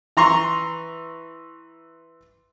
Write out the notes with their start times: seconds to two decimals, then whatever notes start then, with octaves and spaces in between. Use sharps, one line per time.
0.17 E3 A#5 C6 C#6